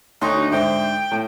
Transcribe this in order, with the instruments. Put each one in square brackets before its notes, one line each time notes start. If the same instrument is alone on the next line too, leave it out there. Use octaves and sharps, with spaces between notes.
[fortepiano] D2 C6 C#6 [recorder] D#4 [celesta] C#5
[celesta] D4 F#4
[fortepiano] G#2 D3 C5 [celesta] E5 D#6 [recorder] G5
[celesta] G6
[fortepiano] A2